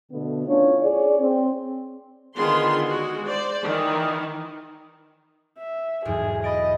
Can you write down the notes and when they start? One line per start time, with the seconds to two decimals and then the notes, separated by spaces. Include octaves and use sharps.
0.11 B2 D3 A3 B3
0.48 C#4 D4 E4 F4 C#5
0.80 G#4 C#5 D5
1.19 C4
2.36 D3 D#3 B3 F4 G#4 C6
2.87 G#3 F#4 G#4
3.27 C5 D5
3.64 D#3 E3
5.58 E5
6.05 B1 E2 G#2 G#4
6.44 D#5 B5 A6 D7